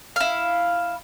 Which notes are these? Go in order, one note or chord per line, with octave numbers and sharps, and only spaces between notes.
E4 F5